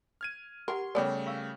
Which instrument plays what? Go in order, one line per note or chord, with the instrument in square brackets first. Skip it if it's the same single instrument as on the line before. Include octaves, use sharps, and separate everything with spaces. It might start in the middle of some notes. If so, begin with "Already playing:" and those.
[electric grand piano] F6 G#6 D#7
[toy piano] G4 F#5 C#6 [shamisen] A#4 [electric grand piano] C6
[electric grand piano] C#3 G3 A3 [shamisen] B3 D5 [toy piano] A#4 C#5 G5
[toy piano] F5 C#6 E6